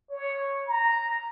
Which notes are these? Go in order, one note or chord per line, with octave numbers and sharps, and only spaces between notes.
C#5
A#5